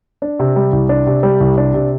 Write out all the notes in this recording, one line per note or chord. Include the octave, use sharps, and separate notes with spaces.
D4
C3
G3
C2
D4
C3
G3
C2
D4
C3